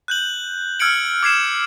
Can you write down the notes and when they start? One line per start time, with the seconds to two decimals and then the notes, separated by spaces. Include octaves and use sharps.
0.08 F#6 G6 F#7
0.80 E6 F6 G#6 C#7 D7 F#7
1.23 D6 G#6 C7 E7